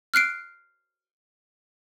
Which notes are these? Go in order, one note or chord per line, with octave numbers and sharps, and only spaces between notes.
F6 F#6 C7 D7